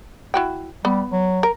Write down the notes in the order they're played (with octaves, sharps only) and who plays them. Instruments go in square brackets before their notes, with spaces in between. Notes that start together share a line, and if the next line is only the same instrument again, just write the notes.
[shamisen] E4 F#4 G5
[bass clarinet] G3 [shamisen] B3
[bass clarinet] F#3
[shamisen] A#4